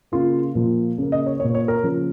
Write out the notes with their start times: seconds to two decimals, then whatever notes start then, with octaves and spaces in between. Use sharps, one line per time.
0.12 C#3 A#3 F4
0.55 A#2 F3 A#3
0.98 C#3 A#3
1.12 D#5
1.26 C#5
1.40 A#2 A#3 C#5
1.55 C#5
1.68 A#4
1.83 C#3 F3 A#3